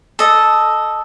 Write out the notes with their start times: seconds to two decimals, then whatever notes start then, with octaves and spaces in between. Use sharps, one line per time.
0.19 A4 D#5